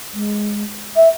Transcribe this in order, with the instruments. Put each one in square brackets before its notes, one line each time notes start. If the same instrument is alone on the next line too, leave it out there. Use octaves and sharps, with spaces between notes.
[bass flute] G#3
E5